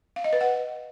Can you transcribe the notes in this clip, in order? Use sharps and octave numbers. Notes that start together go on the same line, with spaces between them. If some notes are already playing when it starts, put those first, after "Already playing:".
F5
D#5
B4
F#5